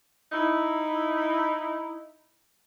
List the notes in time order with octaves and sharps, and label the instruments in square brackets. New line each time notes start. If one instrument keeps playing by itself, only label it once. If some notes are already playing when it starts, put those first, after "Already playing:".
[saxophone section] D#4 E4